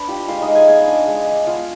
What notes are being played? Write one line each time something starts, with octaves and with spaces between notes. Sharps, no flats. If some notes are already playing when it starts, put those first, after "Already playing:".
Already playing: D4 B4 B5
F4 G4 G5
G#3 F4 F5
D#4 D#5
G#3
G#4 G#5
B3 G#4 G#5
D4
G#3
G#3
B3 F4 F5